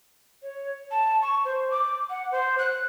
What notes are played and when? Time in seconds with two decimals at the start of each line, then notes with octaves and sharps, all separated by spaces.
0.42 C#5
0.91 A5
1.22 C#6
1.45 C5
1.70 D6
2.10 F#5
2.31 C5
2.58 F#6